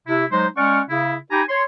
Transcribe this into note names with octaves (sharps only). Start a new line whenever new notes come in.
C3 E4
F#3 G#3 D#4 C5
G#3 C#4 D5 F#5 C#6 F6
C#3 E4
D#4 G4 G5 G#5 A#5 B5
C#5 C6